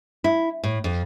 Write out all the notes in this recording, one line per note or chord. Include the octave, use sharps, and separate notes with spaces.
E4
A2
F2